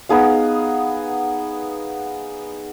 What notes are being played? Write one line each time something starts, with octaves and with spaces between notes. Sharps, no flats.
B3 D#4 G#4 F5